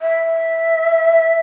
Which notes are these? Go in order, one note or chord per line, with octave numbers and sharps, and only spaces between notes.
E5